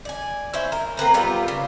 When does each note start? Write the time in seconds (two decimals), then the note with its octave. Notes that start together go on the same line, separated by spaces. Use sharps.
0.05 D5 G#5
0.54 E4 C5 C#5
0.72 A#4
0.97 A#3 C4 B4 A#5
1.14 G3 B3 C4 F4
1.48 C#3